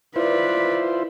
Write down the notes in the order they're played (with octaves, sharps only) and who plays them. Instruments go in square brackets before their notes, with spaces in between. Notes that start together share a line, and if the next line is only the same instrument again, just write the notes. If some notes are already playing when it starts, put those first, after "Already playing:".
[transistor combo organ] E4 F4 C5 [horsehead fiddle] B4 D5